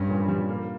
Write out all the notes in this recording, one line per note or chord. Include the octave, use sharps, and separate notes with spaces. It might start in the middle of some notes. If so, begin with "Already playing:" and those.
Already playing: G2 C#4
A#2
G3
A#3